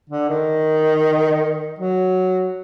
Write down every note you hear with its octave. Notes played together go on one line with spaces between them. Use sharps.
D3
D#3
F#3